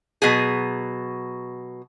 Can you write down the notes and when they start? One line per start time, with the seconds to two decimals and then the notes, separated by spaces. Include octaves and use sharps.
0.22 B2 F#3 G#4